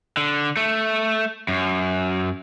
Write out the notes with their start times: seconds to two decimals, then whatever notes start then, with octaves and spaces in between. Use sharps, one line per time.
0.17 D3
0.57 A3
1.48 F#2